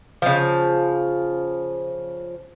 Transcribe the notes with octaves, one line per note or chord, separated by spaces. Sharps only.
C#3 F3